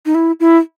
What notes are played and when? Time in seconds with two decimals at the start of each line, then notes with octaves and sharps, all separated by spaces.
0.06 D#4
0.15 E4
0.40 E4